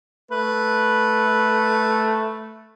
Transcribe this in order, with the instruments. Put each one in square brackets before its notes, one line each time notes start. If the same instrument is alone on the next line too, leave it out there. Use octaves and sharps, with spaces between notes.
[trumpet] A3 [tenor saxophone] B4